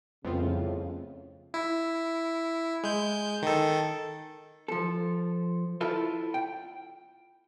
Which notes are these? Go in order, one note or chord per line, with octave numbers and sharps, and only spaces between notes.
C2 F2 A2 C#3 B3 C4 F4
E4
G#3 G6
D#3 A4
F3 A4
E4 F4 A4
G5